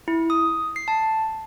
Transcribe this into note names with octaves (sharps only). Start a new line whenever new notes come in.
E4
D#6
C7
A5